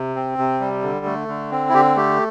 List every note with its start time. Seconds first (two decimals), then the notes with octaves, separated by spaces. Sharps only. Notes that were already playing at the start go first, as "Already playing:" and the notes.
Already playing: C3
0.15 C4
0.38 C3
0.61 G3
0.82 D3
1.05 A3
1.28 D3
1.51 C4
1.69 E4
1.73 D3 G4
1.96 A3 G4